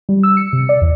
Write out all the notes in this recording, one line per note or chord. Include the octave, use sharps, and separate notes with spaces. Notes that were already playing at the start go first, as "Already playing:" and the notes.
G3
E6
C#7
C3
D5
E2